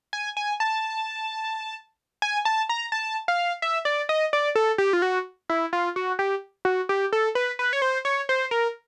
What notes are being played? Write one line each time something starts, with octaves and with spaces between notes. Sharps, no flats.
G#5
G#5
A5
G#5
A5
A#5
A5
F5
E5
D5
D#5
D5
A4
G4
F4
F#4
E4
F4
F#4
G4
F#4
G4
A4
B4
B4
C#5
C5
C#5
C5
A#4